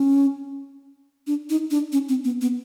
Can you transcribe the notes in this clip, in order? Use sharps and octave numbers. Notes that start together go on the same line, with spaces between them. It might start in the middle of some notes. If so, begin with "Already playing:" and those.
Already playing: C#4
D4
D#4
D4
C#4
C4
B3
B3